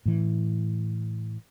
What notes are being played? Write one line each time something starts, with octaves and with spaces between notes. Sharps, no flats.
A2 E3